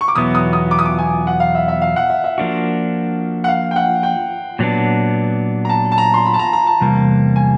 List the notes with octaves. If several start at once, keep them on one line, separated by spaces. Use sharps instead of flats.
C#6
D6
E2 B2 F#3 B3 E4 D#6
D#6
D#6
D6
D#6
D6
G#5
F#5
F5
E5
E5
F5
F#5
E5
E5
F3 A#3 D4 F#4
F#5
F5
G5
F#5
G5
A#2 F#3 B3 D4
A#5
A5
A5
A#5
C6
B5
A5
A#5
A#5
A5
E2 C3 G3 A#3
G#5